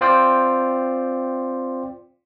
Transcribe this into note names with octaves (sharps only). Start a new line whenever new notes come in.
C4 F4 C5 D5 G5